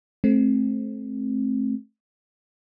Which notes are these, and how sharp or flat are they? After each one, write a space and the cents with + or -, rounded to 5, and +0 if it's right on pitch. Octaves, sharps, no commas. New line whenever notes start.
A3 -25 C4 +20